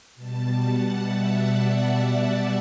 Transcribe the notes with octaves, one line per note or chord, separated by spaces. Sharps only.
B2 G3 A5
F#5
E5
D5
D5
E5
F#5